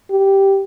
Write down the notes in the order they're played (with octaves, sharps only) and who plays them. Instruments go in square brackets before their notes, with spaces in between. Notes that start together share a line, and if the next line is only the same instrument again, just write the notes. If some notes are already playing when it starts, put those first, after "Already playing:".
[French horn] G4